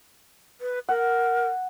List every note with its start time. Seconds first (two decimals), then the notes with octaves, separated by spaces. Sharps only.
0.61 B4
0.89 A#4 F#5